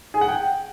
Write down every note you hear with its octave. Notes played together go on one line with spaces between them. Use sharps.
G#4
F#5
G5